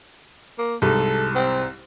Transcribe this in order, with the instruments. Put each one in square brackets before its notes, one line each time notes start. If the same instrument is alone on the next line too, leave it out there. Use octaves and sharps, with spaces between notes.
[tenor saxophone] A#3
[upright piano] C2 G#2 [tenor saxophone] A4
[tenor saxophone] C4